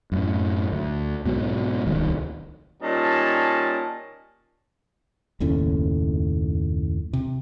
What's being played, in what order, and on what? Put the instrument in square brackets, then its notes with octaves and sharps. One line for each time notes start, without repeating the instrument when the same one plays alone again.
[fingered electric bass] F#2 A2
D2
B1 G#2 B2
D1 C2 D#3
[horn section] A#2 G3 C#4 D#4 A5
[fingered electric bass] F#1 D#2 A2 C#4
C3